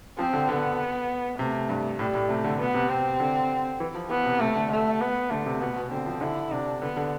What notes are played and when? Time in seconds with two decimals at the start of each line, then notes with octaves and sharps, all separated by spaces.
0.18 F3 C4
0.33 D3
0.49 D3 B3
1.39 C3 A3
1.69 G2
1.99 A2 G3
2.15 A2
2.29 C3 A3
2.44 D3
2.59 B2 B3
2.74 C3
2.89 C4
3.20 D3
3.80 E3
3.95 F3
4.10 E3 B3
4.25 C3
4.40 C3 A3
4.55 D3
4.71 A3
5.00 B3
5.30 D3 A3
5.46 C3
5.60 B2 B3
5.76 B2
5.91 D3 C4
6.06 F3
6.21 D3 E4
6.51 C3 D4
6.82 D3 B3
6.97 D3